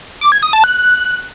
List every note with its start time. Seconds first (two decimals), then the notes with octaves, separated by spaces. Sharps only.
0.21 D6
0.32 G#6
0.43 D#6
0.53 A5
0.64 F#6